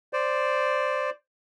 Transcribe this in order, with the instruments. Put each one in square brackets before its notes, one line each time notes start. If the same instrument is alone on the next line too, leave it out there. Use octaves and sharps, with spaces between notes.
[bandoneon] C5 D5